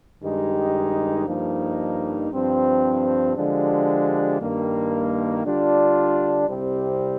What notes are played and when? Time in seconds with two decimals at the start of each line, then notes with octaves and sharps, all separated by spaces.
0.21 G2 D#3 G#3 D#4 G4
1.26 G2 F3 A#3 D#4
2.30 G2 F3 C4
3.34 D3 F3 G#3 D4 G4
4.39 G2 D#3 A#3
5.43 D3 G3 D4 F4
6.47 C2 C3 G3 C4 G4